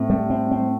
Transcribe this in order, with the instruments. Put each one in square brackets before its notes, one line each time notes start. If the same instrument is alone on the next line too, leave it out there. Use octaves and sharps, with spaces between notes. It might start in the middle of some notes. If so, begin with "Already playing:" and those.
Already playing: [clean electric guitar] A2 [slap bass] C4
[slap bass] G3
C4
C4